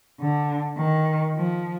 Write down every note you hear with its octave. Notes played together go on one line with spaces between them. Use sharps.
D3
D#3
F3